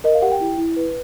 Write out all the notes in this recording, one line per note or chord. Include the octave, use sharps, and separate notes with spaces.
A#4 D#5
F5
G4 F#5
G5
E4
E4
B4